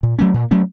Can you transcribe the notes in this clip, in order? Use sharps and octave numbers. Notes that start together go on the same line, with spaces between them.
A#2
F#3 A3 C#4
A#2
F#3 A3 C#4